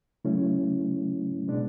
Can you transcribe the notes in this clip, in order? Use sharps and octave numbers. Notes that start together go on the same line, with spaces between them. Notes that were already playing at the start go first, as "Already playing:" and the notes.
C#3 F#3 A3 C#4 E4
B2 G#3 D4